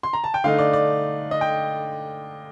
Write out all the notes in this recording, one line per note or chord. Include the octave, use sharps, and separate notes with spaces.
C6
A#5
A5
G5
D3 A3 D#4 F5
D5
D5
D#5
G5